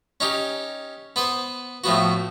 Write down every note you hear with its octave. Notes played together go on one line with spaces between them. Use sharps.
C#4 D#4 G4
B3 B4 C5
A2 F3 B3 F#4